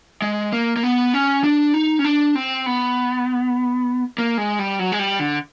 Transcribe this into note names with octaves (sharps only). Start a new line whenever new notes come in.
G#3
A#3
A#3
B3
C#4
D4
D#4
C#4
D4
C4
B3
A#3
G#3
G3
F#3
G#3
G3
D3